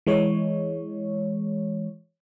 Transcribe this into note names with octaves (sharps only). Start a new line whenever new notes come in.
E3 G#3 C#5